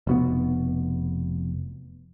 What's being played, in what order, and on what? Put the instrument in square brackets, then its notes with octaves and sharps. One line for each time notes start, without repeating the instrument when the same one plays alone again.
[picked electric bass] F1 B2 B3